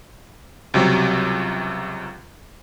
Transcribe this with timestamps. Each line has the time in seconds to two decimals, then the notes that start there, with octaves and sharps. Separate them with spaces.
0.74 C#2 C3 F#3 G3